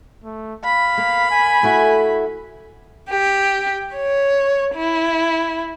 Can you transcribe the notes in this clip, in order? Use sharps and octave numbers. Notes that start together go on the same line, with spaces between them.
A3
F5 B5
A#3
G#5
A3 E4 F#4
G4
C#5
E4